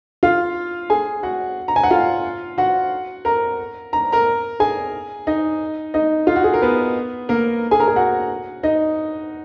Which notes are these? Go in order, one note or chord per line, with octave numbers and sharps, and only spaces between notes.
F4 F5
G#4 G#5
F#4 F#5
A#5
G#5
F#5
F4 F5
F#4 F#5
A#4 A#5
A#5
A#4 A#5
G#4 G#5
D#4 D#5
D#4 D#5
F4
F#4
G#4
A#4
B3 B4
A#3 A#4
G#4 G#5
A#4 A#5
G#4 G#5
F#4 F#5
D#4 D#5